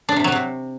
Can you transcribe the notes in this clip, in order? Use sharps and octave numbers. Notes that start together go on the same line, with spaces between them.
D4
C3
F#3
C3